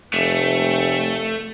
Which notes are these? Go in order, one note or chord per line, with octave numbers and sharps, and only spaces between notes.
F1 A3